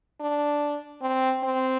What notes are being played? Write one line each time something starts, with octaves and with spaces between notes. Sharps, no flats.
D4
C4
C4